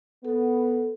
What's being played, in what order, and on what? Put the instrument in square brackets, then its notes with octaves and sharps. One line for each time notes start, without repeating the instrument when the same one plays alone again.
[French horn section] B3 [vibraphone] A4